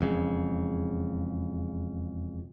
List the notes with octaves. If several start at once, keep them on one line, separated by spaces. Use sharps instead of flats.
E1 F2 C#3